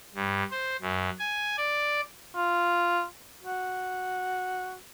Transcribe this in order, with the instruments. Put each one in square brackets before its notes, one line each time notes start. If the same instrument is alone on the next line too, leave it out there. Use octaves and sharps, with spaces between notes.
[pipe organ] G2
C5
F#2
G#5
D5
[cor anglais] F4
F#4